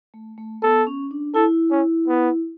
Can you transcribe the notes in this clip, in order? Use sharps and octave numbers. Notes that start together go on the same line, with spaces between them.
A3
A3
B3 A4
C#4
D4
E4 A4
C#4
B3